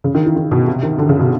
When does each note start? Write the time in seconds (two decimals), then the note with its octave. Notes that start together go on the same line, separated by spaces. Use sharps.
0.04 C#3
0.15 D#3
0.25 E3
0.36 D#3
0.51 B2
0.67 C3
0.83 D#3
0.98 D3
1.09 C#3
1.19 B2